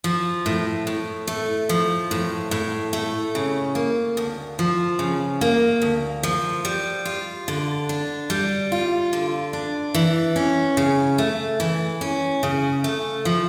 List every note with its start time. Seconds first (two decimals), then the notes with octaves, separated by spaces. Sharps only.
0.04 F3
0.46 A2
0.87 A2
1.27 A3
1.69 F3
2.11 A2
2.51 A2
2.93 A3
3.35 C#3
3.75 A#3
4.17 D2
4.59 F3
4.99 C#3
5.41 A#3
5.82 D2
6.23 F3
6.65 G3
7.05 F4
7.48 D3
7.89 D4
8.30 G3
8.72 F4
9.13 D3
9.53 D4
9.94 E3
10.36 C#4
10.77 C#3
11.18 A3
11.60 E3
12.01 C#4
12.43 C#3
12.84 A3
13.25 F3